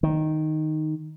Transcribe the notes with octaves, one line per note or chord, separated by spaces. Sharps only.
D#3